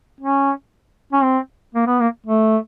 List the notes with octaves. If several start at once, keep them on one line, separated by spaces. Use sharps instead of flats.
C#4
C#4
C4
A#3
B3
A#3
A3